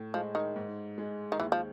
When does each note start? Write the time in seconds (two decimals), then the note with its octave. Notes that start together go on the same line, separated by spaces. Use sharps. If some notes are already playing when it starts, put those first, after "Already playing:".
Already playing: A2
0.14 F3 G#3
0.35 D#3
0.56 G#2
0.98 G#3
1.32 D#3
1.40 D#2 E3
1.52 F3